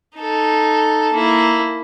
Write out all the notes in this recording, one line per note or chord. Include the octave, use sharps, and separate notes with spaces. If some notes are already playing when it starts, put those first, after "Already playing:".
D#4 A4
A#3 E4